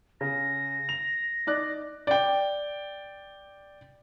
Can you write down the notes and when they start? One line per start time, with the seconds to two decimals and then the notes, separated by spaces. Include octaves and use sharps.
0.21 C#3 A#6
0.89 F7
1.47 D#4 D5 F#6
2.07 D5 G5